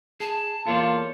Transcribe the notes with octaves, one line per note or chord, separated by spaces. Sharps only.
G#4 A5
E2 A#3 F4 A4 C#5 D5